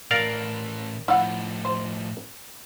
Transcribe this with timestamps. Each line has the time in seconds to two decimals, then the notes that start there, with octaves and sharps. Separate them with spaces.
0.11 A2 E3 A#4 D5 F5
1.08 A2 F3 E4 F#5
1.65 C5